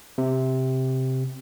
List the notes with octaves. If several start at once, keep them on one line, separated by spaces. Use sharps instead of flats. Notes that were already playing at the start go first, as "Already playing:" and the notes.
C3